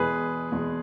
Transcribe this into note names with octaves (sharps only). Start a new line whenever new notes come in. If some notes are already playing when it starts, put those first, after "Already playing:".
Already playing: E2 B2 G#3 G#4 B4
E2 B2 G#3